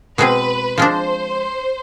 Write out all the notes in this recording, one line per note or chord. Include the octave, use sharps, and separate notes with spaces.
B2 G#3 C4 G#4 B4
F3 G#3 D4 C5